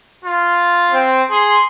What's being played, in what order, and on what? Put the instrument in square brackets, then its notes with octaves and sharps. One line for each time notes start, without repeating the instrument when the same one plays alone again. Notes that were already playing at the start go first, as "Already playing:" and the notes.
[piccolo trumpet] F4
[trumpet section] C4
[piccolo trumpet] G#4 [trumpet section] C6